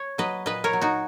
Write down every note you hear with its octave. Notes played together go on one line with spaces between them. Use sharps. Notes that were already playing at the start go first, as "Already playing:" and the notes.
Already playing: C#5
F#3 B4 D#5
A#2 B4 D#5
A#4 C#5
F#3
D#4 F#4